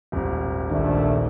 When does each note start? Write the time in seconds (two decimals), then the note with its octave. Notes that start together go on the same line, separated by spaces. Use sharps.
0.12 D#1 G#1
0.70 A#1 D#3 A3 D4